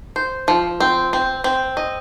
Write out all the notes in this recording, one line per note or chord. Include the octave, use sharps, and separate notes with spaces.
C5
F3
C4
C4
C4
D#5